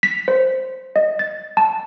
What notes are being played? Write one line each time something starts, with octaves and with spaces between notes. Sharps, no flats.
B6
C5
D#5
A6
A5